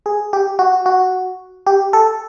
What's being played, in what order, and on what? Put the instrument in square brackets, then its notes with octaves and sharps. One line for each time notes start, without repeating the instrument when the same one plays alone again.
[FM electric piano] G#4
G4
F#4
F#4
G4
A4